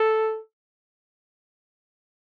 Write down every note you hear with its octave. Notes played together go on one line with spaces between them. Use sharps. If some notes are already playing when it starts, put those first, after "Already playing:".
Already playing: A4